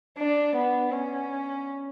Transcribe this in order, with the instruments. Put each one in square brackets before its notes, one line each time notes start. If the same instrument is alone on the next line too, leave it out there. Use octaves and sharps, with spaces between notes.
[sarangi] D4
B3
C#4